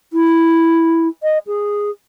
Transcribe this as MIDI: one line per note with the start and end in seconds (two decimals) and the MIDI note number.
0.13 1.08 64
1.23 1.38 75
1.47 1.90 68